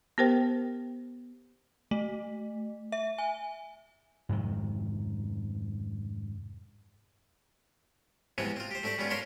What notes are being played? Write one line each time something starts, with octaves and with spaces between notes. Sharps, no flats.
B3 G4 A#4 C5 G5
A3
E5
G#5
F2 G#2 C3 D#3
C3 E3 F3 G#3 B3 C4
C4 F4
G4 C5
A3 C4 D4 G4 D5
G3 G#3 B3 C#4 F4
A#4 C#5 F5 A5 B5 C6